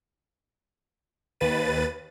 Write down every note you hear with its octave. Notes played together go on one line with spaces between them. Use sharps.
D#2 B4 A6 D#7